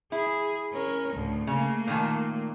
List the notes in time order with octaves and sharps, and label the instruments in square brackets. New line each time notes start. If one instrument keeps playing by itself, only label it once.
[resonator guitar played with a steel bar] E4 [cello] G#4
[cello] C#4 A#4
D2 A2
[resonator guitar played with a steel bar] C#3 [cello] A3 A#3
[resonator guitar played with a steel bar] A#2 D#3 A5